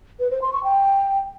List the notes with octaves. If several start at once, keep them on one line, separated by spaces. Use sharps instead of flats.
B4
C5
C6
C#6
G5